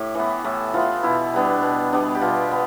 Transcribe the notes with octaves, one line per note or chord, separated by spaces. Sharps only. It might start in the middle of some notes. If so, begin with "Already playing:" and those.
Already playing: A2 G4
E3 B3
A2 A4
E3 B3 F4
B2 E4
G3 B3 D4
B2
G3 B3 D4
G4
B2 F4
B3